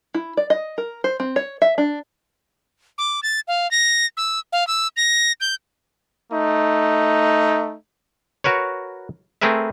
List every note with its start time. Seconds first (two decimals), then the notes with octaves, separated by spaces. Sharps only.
0.14 E4
0.37 D5
0.50 D#5
0.78 A#4
1.04 C5
1.20 C4
1.36 C#5
1.62 E5
1.78 D4
2.98 D6
3.23 A6
3.48 F5
3.71 A#6
4.17 E6
4.52 F5
4.67 E6
4.97 A#6
5.40 G6
6.30 A3 D#4
8.44 F#4 A#4 B4 C#5
9.41 A3 C4 G#4 A#4 B4 E5